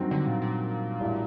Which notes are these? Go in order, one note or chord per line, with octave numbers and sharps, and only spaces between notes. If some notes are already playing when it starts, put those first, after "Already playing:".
Already playing: G2 D#3 F#3 C4
D3
A#2
A#2
A1 A2 G3 D4 F#4